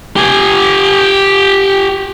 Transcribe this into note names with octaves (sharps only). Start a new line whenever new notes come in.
G4 G#5